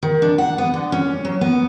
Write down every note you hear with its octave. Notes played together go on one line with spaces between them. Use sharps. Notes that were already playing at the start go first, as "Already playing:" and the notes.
D#3
D4
F#5
B3
D3
C#4
F#3
B3